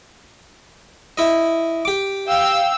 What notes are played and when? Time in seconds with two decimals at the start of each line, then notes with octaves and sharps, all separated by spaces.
1.18 E4 D#5
1.85 G4 D6
2.28 F5 G5 E6